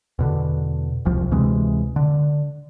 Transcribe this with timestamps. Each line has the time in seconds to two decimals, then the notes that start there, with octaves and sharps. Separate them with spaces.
0.19 E2 B2 D3
1.05 E1 C2 F3
1.31 D2 C3 E3 G#3
1.96 D3